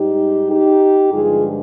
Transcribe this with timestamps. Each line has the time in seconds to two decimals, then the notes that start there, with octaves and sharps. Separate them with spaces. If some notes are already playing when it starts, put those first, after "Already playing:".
Already playing: G#2 G3 D#4 G4
0.49 D#4 G4
1.11 G2 D3 F3 G#3 F4 G#4